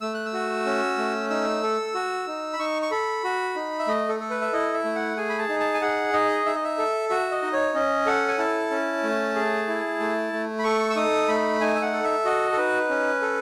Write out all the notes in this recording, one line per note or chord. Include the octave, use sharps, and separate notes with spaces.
A3 E6
F#6
E6
F#4
C#4
A3
D#4 E6
A4
F#4
D#4
B5
D#4 C#6
C#6
A4 B5
F#4
D#4
E5
A3 D#5
A4
A4
B4
E5
E4 D#5
E5
A3
F#5
G#4 G#5
B5
A5
D#4
A5
G#5
G#4 F#5
D#4 D#5
D#4 E5
D#5
E5
A4
F#4 E5
D#5
D#4
C#5
C#4 D#5
A4 F#5
G#5
E4 A5
C#4
A3
G#4
E4
A3
A3
B5
A4 C#6
E6
D#4 D#6
A3 B5
D#4 G#5
E5
F#5
A4
E5
F#4 D#5
A4
D#4 B4
C#4
A4